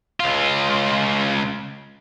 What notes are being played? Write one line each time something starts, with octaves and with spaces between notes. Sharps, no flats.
C#2 F4